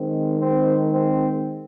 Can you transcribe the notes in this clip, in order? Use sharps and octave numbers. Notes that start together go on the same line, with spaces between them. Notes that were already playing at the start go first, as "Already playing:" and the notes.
Already playing: D#3 G#3 C4
C4
C4